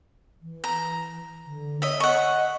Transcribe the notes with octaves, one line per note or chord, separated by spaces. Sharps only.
E3
A#5
D3
C#5 D#5 E5
D#5 F#5 C#6